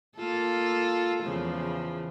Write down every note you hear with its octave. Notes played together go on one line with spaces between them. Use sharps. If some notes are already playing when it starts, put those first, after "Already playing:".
A#3 F4 A4
E2 C#3 F3